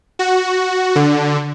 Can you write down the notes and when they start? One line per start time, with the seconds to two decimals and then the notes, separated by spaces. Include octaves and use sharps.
0.19 F#4
0.96 D3